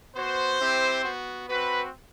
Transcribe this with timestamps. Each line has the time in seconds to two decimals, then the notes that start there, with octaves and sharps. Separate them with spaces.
0.15 B3 F#4 C5
0.60 C4 E4 G4
1.04 B3 F#4
1.48 C4 F#4 B4